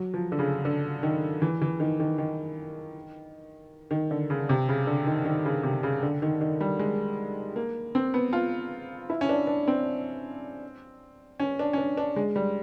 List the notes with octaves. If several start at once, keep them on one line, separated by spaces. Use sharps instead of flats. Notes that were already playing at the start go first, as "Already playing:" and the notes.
Already playing: F#3
F3
D3
C#3
D3
D#3
E3
E3
D#3
D#3
D#3
D#3
D3
C#3
C3
C#3
D3
D#3
D#3
C#3
C3
C#3
D3
D#3
D#3
G3
G#3
A#3
C4
B3
F4
E4
C#4
D4
D4
C4
C#4
D4
C#4
D4
D4
G#3
G3